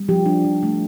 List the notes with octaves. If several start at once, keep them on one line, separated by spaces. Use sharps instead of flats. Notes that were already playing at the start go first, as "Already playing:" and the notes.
Already playing: G3
F3 G4
D4
F3
A3